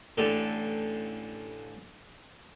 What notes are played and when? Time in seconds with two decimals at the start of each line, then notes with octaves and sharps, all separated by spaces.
0.17 A1 D3 G4 A4